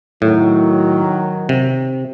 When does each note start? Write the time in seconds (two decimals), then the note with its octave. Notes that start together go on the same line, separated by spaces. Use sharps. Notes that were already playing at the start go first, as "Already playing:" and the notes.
0.22 A2 D#3 F#3
1.49 C3